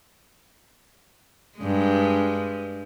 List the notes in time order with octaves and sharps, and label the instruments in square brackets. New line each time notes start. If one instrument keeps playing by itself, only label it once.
[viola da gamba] G2 G#3